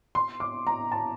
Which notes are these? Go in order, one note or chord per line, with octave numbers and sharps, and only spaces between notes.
C6
D6
A#5
A5